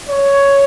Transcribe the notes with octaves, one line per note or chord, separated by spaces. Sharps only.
C#5